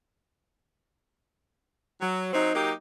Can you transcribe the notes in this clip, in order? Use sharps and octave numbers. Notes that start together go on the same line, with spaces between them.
F#3
F#3 C4 D#4
F#3 A#3 D#4 G4